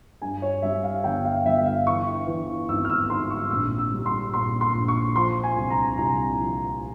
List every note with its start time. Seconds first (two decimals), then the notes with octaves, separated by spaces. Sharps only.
0.22 G2 G#5
0.42 C#5
0.62 G3 E5
0.83 F5
1.04 G1 G5
1.25 F5
1.45 G1 E5
1.66 F5
1.87 E3 C#6
2.27 E3
2.69 G#1 E6
2.85 F6
2.90 E6
3.10 G#2 C6
3.30 C#6
3.51 A#1 E6
3.78 E6
3.92 G3
4.06 C6
4.34 A#2 C6
4.61 C6
4.74 A#1
4.88 C#6
5.16 F3 C6
5.43 G#5
5.56 C2
5.70 A#5
5.97 C2 A#5
6.39 F3